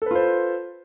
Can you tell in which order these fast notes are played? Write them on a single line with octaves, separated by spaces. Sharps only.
A4 B4 F4 C5